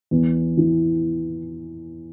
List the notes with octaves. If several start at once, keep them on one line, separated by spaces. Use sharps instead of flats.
E2
E3